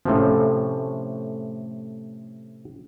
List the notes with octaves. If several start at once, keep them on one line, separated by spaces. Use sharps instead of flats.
A2 C3 F3 A3 C#4